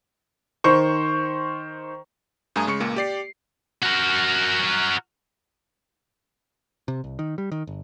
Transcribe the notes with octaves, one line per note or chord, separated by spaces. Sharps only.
D#3 C5 C#6
G2 A3 G#5 A#5 D#6
C#3 G#3 C#6 C#7
C#2 A#2 A#3
G4 D5 C7
F#4 A#4
C3
C2
D#3
G3
D#3
G1